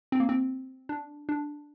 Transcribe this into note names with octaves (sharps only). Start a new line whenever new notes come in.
C4
A#3
C4
D4
D4